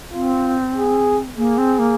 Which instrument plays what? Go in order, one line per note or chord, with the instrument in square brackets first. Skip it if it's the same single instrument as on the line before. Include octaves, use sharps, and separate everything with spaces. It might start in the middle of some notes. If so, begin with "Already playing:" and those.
[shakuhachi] C4 [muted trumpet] F4
[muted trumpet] G#4
[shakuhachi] A#3 [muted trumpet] G#4
[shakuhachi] C4
A#3